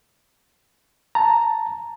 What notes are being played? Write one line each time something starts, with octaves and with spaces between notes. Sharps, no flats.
A5 A#5